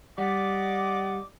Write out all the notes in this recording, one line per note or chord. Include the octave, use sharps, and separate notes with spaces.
G3 D5 D#5 F#5 D6